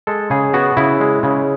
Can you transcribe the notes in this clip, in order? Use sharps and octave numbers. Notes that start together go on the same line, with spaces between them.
G#3 A4
C#3 G#4
B3 F#4
C#3 E4
G#3
C#3